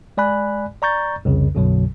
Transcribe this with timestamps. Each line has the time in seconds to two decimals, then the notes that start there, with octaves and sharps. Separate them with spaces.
0.17 G#3 D5 G#5 B5 F#6
0.82 D5 A#5 C#6 G6 A6
1.25 C2 F2 C#3
1.55 B1 F#2 B2 D3 F#3